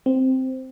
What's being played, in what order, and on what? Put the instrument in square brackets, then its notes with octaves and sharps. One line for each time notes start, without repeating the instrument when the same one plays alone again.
[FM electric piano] C4